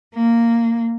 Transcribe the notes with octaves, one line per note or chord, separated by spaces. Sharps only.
A#3